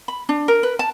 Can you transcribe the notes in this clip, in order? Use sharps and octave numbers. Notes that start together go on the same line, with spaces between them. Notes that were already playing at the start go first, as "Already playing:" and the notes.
B5
D4
A#4
B4
A5